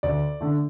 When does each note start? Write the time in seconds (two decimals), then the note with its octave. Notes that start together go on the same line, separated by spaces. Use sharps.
0.03 D2 D5
0.41 D3 A3